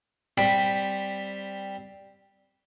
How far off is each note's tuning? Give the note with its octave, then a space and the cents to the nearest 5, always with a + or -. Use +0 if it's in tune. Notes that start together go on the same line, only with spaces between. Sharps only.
G3 +0 C4 +0 B5 +0